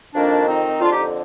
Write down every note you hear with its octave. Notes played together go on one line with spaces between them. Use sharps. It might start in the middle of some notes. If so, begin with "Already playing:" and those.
F2 D#3 A#3 D4
C4 D#4
F2 D3 D4 F4
D#4 G4